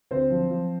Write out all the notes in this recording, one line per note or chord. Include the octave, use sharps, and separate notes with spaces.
D2 C4 C5
F3
F3